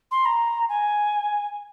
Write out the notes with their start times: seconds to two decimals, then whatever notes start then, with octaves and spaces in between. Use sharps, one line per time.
0.11 C6
0.25 A#5
0.69 G#5